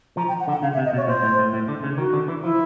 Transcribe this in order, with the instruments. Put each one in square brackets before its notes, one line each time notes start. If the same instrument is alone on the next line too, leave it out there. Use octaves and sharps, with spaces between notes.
[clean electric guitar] F3 [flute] A#5
[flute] G5
F#5
[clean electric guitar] D3
[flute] F#5
[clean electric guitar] C#3 [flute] F5
[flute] E5
[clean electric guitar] C3
[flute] D#5
[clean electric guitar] B2
[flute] C#5
[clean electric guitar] A#2 [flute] C5
[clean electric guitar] A2
A2
A2
D3
C#3
[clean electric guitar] D#3 [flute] F#4
[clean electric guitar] D3
E3
[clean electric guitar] F3 [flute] E4